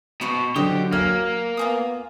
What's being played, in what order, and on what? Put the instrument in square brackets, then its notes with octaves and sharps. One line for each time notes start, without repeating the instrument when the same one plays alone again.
[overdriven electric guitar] B2 [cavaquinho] D#4 F#4 C5
[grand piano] D3 [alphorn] F#3 [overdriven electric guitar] G4 [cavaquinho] C5 D5 D#5
[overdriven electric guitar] A#3 [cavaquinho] G#5 [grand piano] F6
[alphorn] B3 [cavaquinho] F4 G#5 D#6